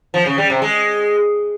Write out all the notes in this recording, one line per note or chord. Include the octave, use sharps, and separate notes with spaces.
F3
C#3
G3
C3
G#3